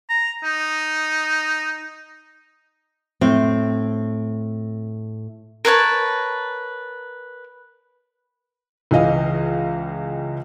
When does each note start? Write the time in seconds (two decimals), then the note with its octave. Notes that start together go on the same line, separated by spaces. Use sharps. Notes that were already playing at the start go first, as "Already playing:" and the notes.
0.09 A#5
0.44 D#4
3.21 A2 C4
5.65 A#4 B4 C#5 A5
8.91 C#2 E3 D#5 F5